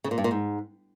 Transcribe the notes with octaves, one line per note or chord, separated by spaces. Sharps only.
C#3
A#2
G2
A#2
G#2